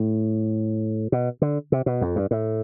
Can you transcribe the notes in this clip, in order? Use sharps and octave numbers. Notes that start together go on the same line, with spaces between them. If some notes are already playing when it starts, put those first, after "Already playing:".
Already playing: A2
B2
D3
C3
B2
F2
G2
A2